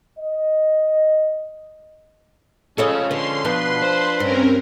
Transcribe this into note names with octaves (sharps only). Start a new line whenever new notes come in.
D#5
F3 G#3 C#4 G#4 A4 C#5 D#5 F5
D3 B4 C6
B2 F3 D4 B4
C5
G2 C4 C#4 A#4